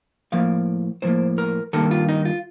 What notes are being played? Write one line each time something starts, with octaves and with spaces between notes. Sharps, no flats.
A2 F3 A#3 F5
A2 F3 A#3 C5
A#4
G2 D#3 A#3 A4
F4
D#4
F4